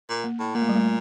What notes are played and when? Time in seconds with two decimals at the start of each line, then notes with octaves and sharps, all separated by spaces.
0.09 A#2
0.24 A#3
0.40 A2
0.55 A#2 A#3
0.62 A3
0.69 G3
0.76 A3